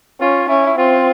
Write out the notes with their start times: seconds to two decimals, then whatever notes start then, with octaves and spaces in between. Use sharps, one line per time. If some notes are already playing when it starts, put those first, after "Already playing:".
0.20 C#4 F4
0.49 C#4 E4
0.66 E4
0.78 C4 F4